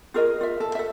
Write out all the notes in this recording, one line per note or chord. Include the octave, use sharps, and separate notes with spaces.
F4 G#4 A#4 D#5
F4 E5
A4
A4 E5